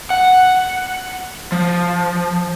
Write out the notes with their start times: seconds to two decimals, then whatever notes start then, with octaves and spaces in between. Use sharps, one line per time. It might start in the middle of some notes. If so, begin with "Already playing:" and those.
0.10 F#5
1.52 F3